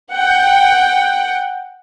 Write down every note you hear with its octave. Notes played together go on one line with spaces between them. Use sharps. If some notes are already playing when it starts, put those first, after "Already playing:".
F#5 G5